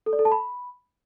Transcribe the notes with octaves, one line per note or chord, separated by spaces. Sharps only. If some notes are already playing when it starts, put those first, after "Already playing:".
A4
D5
A4
A5
B5